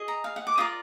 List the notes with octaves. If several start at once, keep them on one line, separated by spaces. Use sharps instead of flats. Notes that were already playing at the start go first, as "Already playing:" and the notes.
Already playing: G#4 D#5
A#5
F5
F#5
D6
F4 A#4 D5 D#6